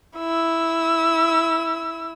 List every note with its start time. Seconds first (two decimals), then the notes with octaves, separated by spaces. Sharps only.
0.18 E4 E6